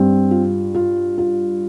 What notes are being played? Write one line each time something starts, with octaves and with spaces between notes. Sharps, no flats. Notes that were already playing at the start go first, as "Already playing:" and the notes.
Already playing: G2 C4
F4
F4
F4